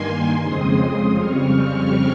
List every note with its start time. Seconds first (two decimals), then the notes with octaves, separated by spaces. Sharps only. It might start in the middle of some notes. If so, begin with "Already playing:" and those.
Already playing: G2 D#3 A#3 G#5 C6
0.42 F2 C#3 G#3 C4 C6 D#6
1.16 F2 C#3 G3 C4 C#6 F6